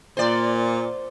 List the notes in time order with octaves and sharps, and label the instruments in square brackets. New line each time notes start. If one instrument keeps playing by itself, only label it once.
[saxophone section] A#2 [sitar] C5 D5